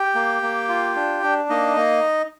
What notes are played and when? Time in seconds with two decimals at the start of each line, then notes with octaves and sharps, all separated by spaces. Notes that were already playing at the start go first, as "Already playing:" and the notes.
Already playing: G4 G5
0.15 A#3
0.42 A#3
0.69 F4
0.96 D4
1.23 D4
1.49 A#3 D#4 D#5
1.76 A#3